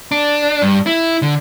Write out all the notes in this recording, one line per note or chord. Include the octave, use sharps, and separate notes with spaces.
D4
G2
E4
D3